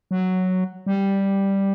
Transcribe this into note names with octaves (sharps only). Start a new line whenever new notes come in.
F#3
G3